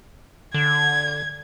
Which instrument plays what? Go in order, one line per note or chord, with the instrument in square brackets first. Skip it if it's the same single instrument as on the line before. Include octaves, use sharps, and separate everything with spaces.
[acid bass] D3 [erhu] G#6